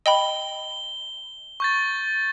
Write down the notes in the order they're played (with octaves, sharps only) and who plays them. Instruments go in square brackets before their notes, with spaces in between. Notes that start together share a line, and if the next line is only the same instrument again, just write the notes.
[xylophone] D#5 G5 B5 [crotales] G7
[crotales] C#6 G6 A6